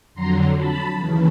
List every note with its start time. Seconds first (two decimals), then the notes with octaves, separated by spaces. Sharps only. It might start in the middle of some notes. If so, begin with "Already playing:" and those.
0.15 F2 D3 F#3 A#5 C6
0.56 A5 B5
0.98 D#2 C#3 E3